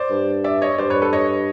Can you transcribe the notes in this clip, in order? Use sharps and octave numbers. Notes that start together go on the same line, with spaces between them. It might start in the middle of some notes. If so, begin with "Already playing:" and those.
Already playing: C5 D5
G2
D5 E5
C#5 D#5
G2 C5 D5
B4 C#5
A4 B4
C#5 D#5